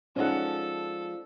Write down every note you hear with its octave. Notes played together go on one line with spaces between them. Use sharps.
F3 G#3 C#4 D#4 A4 C5 D5 F#5